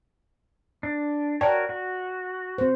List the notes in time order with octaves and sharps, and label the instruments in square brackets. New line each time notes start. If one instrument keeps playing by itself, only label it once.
[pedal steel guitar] D4
[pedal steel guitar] F#4 A#4 C#5 [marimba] D5 G5 A5
[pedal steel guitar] F#4
[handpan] C4 C5